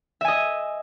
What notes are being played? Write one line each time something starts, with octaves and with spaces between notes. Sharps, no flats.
D#5 E5 G#5